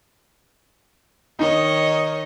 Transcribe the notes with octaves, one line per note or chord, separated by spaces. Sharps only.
D#3 D#4 C#5 D#5